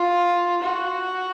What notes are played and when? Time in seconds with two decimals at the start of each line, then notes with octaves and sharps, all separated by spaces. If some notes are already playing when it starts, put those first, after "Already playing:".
Already playing: F4
0.63 F#4